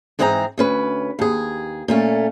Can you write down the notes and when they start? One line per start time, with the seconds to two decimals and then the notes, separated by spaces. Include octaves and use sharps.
0.19 G#2 E3 C4 G#4 C5 A#5
0.58 D2 C#4 B4
1.19 D#2 G#4
1.88 A#2 A3 C#4